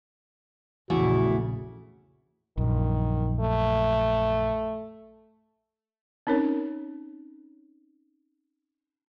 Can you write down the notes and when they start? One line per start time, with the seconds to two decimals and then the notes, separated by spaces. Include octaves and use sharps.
0.90 A#1 E2 C#3 A3 E4 F#4
2.58 A#1 F#2 D#3
3.40 A3
6.27 C4 C#4 D#4 A#4 C#5